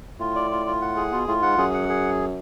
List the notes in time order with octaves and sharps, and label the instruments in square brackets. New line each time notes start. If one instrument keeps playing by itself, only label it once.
[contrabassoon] A2 [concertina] F4
[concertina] D5
F4
F4
F#5
G#4
[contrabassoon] B2 [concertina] F4
[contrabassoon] A2 [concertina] F4
[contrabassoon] G#2 [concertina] F#5
[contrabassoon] F#2 [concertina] G#4
[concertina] F#5
G#4